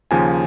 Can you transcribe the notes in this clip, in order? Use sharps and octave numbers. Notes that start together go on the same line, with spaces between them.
D#2 C#3 F3 G#5